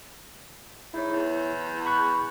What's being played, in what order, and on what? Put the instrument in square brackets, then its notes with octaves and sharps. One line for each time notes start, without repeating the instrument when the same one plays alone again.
[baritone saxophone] G#2 [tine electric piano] E4 C#5
[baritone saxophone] E2
[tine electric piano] B5 C#6 F#6